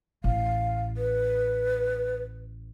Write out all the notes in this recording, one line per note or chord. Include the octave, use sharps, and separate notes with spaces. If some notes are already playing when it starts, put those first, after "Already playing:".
A1 F5
B4